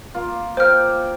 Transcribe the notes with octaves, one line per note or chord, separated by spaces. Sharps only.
A#3 F4
A#3 C5 G5 F6